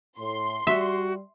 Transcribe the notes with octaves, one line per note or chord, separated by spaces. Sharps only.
A2 C6
G3 F#4 E5